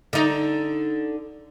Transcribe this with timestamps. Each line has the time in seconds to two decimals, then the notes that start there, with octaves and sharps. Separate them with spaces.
0.13 D3 D#4